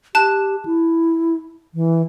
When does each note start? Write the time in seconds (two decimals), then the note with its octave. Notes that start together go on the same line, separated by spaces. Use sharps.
0.15 G4 A5 F#6 E7
0.65 E4
1.74 E3